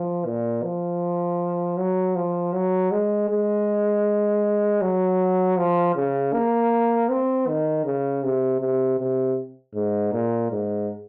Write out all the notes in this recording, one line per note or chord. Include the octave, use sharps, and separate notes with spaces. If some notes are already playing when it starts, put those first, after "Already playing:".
Already playing: F3
A#2
F3
F#3
F3
F#3
G#3
G#3
F#3
F3
C#3
A#3
C4
D#3
C#3
C3
C3
C3
G#2
A#2
G#2